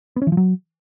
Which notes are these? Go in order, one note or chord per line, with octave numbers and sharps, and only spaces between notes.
B3
C#4
E3
F3
F#3